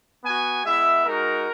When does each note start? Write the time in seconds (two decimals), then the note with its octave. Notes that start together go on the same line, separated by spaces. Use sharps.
0.24 B3 F#4 G#5
0.65 G#3 B3 E4 E5
1.05 G#3 D#4 F#4 A#4